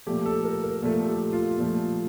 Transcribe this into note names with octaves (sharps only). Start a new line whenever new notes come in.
A#2 F3 A3 G4
A4
A#4
A#4
A#2 F3 A3 A4
G4
F4
A#2 F3 A3